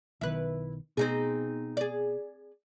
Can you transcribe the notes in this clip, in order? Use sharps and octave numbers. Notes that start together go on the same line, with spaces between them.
B1 D#3 E4 B4
B2 C4 D#4 G#4
G#4 D5